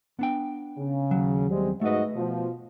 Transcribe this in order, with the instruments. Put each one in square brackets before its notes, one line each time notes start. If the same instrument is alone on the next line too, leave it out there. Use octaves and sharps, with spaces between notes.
[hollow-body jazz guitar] B3 D4 G5
[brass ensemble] C#3
[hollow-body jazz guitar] D#2 F#3
[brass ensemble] G3 G#3 C4
[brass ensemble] G#2 F#4 D#5 [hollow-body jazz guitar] A3 B4
[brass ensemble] B2 F3